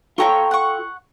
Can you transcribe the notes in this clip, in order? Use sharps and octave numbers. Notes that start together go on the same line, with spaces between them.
F4 A4 C#5 G5 A#5 C#6
F#5 C#6